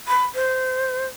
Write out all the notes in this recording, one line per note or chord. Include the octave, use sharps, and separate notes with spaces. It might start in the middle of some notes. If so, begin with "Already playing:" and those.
B5
C5